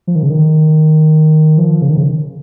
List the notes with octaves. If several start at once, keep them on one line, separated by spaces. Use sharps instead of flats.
F3
D#3
C#3
D#3
F3
C#3
D#3
C#3